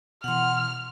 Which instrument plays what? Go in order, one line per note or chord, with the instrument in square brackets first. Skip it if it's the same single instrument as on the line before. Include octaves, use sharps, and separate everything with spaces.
[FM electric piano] B2 E3 [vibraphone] F#5 C6 [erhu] F6